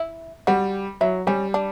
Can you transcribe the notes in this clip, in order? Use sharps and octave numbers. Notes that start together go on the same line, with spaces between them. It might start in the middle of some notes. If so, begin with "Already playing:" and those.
Already playing: E4
G3 F#4
F#3 E4
G3 C#4
D4